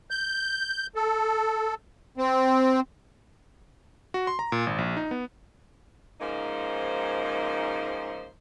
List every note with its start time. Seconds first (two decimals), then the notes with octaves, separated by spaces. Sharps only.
0.11 G6
0.95 A4
2.18 C4
4.14 F#4
4.27 C6
4.39 A#5
4.52 A#2
4.67 G#1
4.78 A#1
4.97 D#4
5.11 B3
6.20 G#2 C#3 F3 A#3 D#4 C5